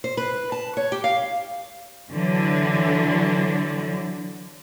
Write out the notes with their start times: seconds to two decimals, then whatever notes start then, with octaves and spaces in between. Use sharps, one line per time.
0.04 C5
0.17 B4
0.52 A5
0.77 C#5
0.92 G4
1.04 F5
2.10 D3 E3 F#3 D4